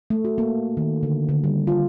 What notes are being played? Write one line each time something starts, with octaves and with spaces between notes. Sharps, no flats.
A3
F#4
A#3
D#3
D3
D3
G3
F4